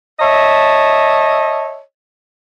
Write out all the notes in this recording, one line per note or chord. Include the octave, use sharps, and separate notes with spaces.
C#5 D#5 E5 A5